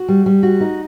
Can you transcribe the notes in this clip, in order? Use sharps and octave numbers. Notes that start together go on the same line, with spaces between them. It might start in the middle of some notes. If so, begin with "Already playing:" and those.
Already playing: F#4
G3
G3
F#4
D#4